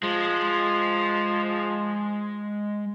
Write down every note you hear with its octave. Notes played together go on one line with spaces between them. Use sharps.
F3 G#3